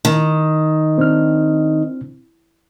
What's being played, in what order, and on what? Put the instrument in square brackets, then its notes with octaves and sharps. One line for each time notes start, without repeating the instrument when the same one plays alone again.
[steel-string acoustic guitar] D#3
[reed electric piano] C4 D4 F6